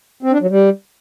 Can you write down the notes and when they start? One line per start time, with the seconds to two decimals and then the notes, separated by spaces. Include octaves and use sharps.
0.23 C4
0.32 D4
0.41 F#3
0.50 G3